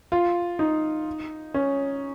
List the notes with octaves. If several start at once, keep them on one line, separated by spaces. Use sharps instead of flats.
F4
D#4
C#4